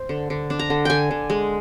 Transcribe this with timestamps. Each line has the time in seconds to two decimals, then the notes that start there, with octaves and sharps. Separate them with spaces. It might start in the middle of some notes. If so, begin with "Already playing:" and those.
Already playing: C5
0.09 D3
0.30 D3
0.50 D4
0.59 A#5
0.70 D3
0.85 D3 G5 G#5
1.11 D3
1.30 G#3